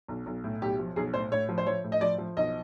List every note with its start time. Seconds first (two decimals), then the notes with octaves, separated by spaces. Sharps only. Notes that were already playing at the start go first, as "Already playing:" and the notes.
0.08 B1
0.26 B1
0.44 A2
0.62 B1 G4
0.79 F3
0.96 B1 G#4
1.14 A2 C5
1.31 A2 C#5
1.49 F3
1.58 C5
1.66 F3 C#5
1.84 A2
1.92 D#5
2.01 F3 D5
2.18 F3
2.37 B1 D#5